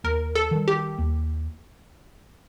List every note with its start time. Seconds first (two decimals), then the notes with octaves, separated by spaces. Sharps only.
0.04 D#2 A#4
0.35 A4
0.51 D#3 G3
0.68 G4
0.98 D#2